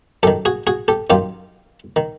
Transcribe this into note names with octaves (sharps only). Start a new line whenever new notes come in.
F#2 D#3 G4 A4
F#4 G#4
F#4 G#4
G4 A4
F#2 D#3 F4 G4
D#3